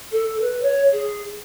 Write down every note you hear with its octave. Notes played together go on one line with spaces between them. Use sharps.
A4
B4
C#5
G#4